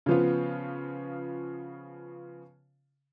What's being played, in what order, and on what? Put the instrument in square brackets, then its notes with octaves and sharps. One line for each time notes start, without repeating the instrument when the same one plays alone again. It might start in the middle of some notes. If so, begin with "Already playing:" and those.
[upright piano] C#3 F3 B3 F4